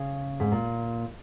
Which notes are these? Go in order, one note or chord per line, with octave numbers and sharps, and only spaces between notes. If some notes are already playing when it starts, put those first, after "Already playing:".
Already playing: C#3
G#2
A#2